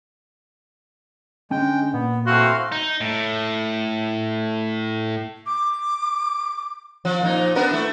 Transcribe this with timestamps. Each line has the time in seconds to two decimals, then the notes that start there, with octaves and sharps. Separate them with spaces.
1.51 D3 G#3 C#4 G5 G#5
1.93 A#2 B3
2.26 E3 A3 C4 F#4 F5 C6
2.72 D#4
3.01 A2
5.46 D6
7.05 F3
7.21 A#2 F3 D#4
7.55 B3 D4 A#4
7.71 A3 E4